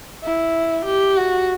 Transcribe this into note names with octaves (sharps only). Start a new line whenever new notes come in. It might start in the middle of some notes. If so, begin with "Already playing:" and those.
E4
G4
F#4